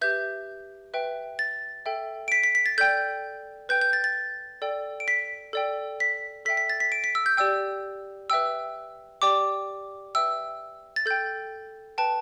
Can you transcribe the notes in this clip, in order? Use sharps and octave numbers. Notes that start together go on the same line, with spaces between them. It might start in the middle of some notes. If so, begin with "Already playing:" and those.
G4 B4 E5 G6
B4 E5 G5
A6
A4 E5 G5
D7
B6
B6
B6
A6
A4 D5 G5 G6
B4 G5 G6
G6
A6
A6
A4 D5 G5
D7
B6
A4 D5 G5
B6
A4 E5 G5 B6
B6
A6
B6
D7
B6
E6
G6
G4 D5 G5 E6
B4 E5 G5 E6
G4 D5 G5 D6
B4 E5 G5 E6
A6
A4 G5 G6
B4 G5 A5